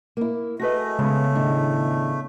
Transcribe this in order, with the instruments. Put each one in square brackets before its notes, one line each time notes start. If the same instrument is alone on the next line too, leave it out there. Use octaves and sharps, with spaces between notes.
[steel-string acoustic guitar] A#3 E4
[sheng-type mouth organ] A3 [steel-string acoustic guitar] F#4 G#4 D#5 [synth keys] B4 A#6
[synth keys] C#3 B3 [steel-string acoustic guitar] G#3
[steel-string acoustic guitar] A2 D#3 D4